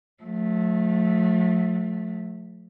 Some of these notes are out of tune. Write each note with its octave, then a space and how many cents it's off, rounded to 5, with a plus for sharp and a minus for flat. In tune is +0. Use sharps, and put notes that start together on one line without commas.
F3 +45 A3 -10